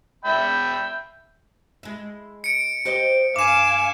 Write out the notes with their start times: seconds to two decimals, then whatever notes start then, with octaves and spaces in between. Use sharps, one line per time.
0.25 E5 G5 B5
1.83 G#3 E4
2.44 C#7 D7
2.85 G4 C5 D#5
3.36 G2 F5 G#5 D6 E7